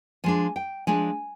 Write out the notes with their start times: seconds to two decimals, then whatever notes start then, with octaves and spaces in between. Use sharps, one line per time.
0.24 F3 G#3 D4 G#5
0.56 G5
0.87 F3 G#3 D4 G#5